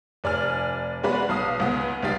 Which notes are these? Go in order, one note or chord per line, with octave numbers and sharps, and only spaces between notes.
F1 D5 G#5 F6
G#3 B3 F#4 B4 D5
B1 F5 D#6
C#2 B3
C#2 G3 D#4 G4 F5 A6